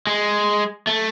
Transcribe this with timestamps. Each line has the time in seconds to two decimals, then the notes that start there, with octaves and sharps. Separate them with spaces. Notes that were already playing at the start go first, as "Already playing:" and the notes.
0.07 G#3
0.87 A3